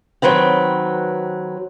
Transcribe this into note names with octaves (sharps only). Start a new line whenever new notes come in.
D#3 F#3 C4 B4 G5